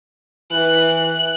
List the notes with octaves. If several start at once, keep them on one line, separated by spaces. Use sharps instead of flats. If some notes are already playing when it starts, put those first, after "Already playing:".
E3 F#6